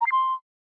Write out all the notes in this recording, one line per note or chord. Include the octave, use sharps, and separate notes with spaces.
A#5
C7
C6